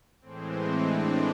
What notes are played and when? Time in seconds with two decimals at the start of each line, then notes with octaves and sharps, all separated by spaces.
0.21 A2 E3 G#3 C4
0.83 D4